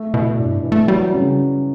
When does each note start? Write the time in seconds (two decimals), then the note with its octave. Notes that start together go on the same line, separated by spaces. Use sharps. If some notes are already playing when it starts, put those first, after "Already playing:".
Already playing: A3
0.14 B2 E4
0.38 G2 D4
0.55 B2
0.63 E3
0.72 A3
0.88 F#3 G3
1.14 C#3